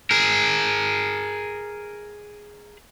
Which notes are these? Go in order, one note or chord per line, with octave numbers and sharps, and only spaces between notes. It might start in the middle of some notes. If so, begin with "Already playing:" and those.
G#4 A#4